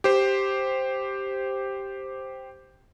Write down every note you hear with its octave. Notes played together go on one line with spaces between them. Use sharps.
G4 C5